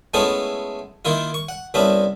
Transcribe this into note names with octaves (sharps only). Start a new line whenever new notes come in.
G#3 A3 B3 C#4 E4 A4
D#3 A#3 E4 F4
C#6
F#5
C2 B3 C#4 D4 E5